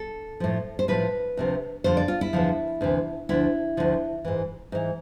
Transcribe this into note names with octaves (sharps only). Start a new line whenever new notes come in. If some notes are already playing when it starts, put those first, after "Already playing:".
Already playing: A4
A2 F3
C5
A2 F3 B4
D2 C3 F3
F2 D3 F3 C5
D5
F4
E4
E2 D3 F3
D2 C3 E3
D2 D3 F3 E4
D2 D3 F3
G#2 E3
G#2 E3